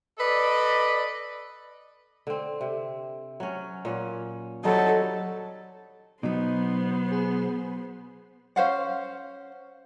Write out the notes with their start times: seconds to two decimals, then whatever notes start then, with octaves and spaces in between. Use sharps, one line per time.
0.18 A4 B4 D5 D#5
2.27 D3 C4
2.61 C3
3.40 F#3 C#4
3.85 A#2 C#4 F#5
4.64 F#3 G3 C4 D#4 A4
6.23 B2 F#3 B3 D#4 C5
7.12 G#4
8.56 C#4 C5 F5 F#5